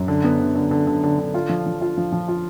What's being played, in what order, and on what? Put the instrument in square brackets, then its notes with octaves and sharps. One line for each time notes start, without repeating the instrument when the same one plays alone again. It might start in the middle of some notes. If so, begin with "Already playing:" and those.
Already playing: [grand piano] F#2
D3
B3
D3
D3
D3
D3
D3
D3
F4
F3
F3
F4
F3
F3
F4